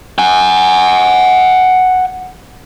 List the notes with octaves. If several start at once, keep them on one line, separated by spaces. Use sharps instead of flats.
F#5 G#5